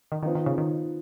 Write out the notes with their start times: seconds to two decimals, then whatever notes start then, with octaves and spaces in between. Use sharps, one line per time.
0.12 D#3
0.23 D#3 F3 B3 D#4
0.35 D#3
0.46 C#3
0.58 D#3